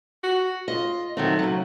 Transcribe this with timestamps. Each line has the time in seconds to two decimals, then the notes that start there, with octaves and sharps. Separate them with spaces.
0.23 F#4
0.68 F4 D#5
1.17 D#3 F#3 A3 C4
1.39 C#3 F#3